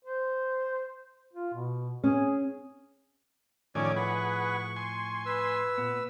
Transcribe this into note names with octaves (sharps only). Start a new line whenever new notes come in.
C5
F4
B2
C#4 G#4
A2 D#3 F3 A3 C#4 C#5 D5 G#5
G#4 B4 F#5 C#6
G#5 C6
B4 E6
A#2 B3